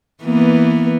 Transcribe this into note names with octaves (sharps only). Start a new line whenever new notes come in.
E3 A#3 B3